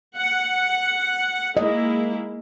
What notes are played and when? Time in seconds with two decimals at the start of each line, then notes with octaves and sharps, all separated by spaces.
0.17 F#5
1.57 G#3 A#3 E4 D#5